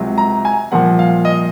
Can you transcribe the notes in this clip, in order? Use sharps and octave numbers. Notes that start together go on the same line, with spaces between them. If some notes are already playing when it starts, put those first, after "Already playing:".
Already playing: C#2 C3 F#3
A#5
G#5
C2 A#2 F3 F#5
F5
D#5